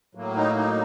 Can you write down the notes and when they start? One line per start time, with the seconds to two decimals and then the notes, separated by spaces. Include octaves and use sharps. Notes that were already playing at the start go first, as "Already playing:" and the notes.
0.15 A2 F#3 A#3
0.37 D#4
0.56 D#4